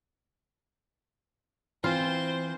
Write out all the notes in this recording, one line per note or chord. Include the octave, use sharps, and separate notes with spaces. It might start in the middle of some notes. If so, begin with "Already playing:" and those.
E3 C4 F4 C5